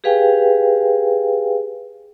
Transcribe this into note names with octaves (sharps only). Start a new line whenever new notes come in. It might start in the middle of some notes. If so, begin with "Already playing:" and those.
G4 G#4 B4 F5 G5 G#5